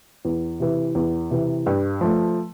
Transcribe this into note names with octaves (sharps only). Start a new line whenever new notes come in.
E2
C3 E3
E2
C3 E3
G2
F3 A3